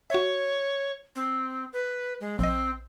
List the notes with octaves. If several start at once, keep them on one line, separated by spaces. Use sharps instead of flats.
F#4 C#5 E5
C4
B4
G#3
A#1 C4 D#5